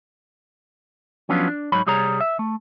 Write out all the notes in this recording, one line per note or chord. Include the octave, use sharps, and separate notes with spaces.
F3 F#3 B3 C#4 D4 F4
D4
G#2 F#3 D#4 C#5 B5
C2 G3 G#4 C#5 A#5
E5
A3